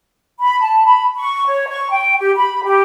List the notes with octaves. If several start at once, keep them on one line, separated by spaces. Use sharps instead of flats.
B5
A5
B5
C#6
C#5
C#6
G5
G4
B5
G4